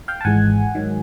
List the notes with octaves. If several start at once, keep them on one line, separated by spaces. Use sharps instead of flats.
F5 G5
A5
G#1 G#2 E3 G#3 F#5 G#5
G#2 D#3 F#3